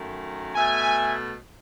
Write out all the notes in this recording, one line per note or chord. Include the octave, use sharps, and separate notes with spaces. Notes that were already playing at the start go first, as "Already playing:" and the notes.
Already playing: F#2 D#3 A3
B2 A3 E5 G#5